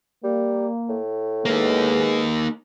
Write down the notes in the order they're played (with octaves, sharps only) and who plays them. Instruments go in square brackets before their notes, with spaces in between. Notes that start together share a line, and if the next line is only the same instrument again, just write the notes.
[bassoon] G3 [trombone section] A#3
[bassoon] A2
[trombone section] G#3 B3 G#4 [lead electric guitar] A#3 D#4